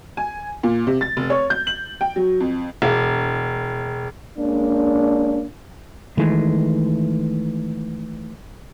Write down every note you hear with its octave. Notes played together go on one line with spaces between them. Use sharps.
G#5
A#2
C3
A6
F1
C#5
G6
F#7
G5
F#3
F2
E1
G#3 A#3 C#4 D4
D#3 E3 G#3 A3